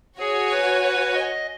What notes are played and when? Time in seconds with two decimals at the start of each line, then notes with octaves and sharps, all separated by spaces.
0.19 F#4 G#4 C#5 G#5
0.51 B4
0.82 B4
1.14 D#5